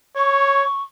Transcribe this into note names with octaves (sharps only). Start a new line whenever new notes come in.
C#5 C#6